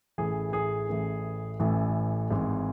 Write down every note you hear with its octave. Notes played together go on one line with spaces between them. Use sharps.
A1 A2 E3 G#4
G#4
A1 A2 E3
A1 A2 E3
G#1 G#2 E3